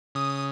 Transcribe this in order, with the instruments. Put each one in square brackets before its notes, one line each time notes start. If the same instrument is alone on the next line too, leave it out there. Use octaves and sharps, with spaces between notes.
[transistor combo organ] C#3 [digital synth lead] D#6